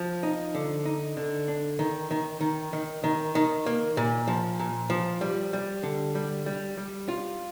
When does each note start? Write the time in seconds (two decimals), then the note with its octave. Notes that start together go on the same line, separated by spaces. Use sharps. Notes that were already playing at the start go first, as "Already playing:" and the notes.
Already playing: F3
0.23 D#4
0.55 D3
0.85 D#4
1.17 D3
1.48 D4
1.79 D#3
2.11 D#3
2.41 D#3
2.73 D#3
3.04 D#3
3.35 D#3
3.66 A#3
3.97 A#2
4.27 F3
4.60 A#2
4.90 F3
5.21 G3
5.53 G3
5.83 D3
6.15 G3
6.46 G3
6.78 G3
7.08 F4